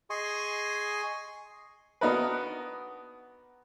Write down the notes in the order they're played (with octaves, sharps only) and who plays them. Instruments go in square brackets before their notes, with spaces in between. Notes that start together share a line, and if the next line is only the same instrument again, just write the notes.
[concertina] G#4 D#5 G#5 C6 C#6
[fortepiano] B3 D4 D#4 F#4 A#4 B4